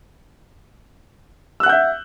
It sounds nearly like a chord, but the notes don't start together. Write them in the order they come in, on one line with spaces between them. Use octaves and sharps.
E6 F#6 F#5 G6 E5